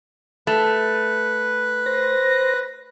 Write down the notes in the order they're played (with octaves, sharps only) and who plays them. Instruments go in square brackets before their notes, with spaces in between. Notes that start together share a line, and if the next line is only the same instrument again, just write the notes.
[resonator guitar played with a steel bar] A3 [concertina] B4
[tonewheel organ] C5 A#6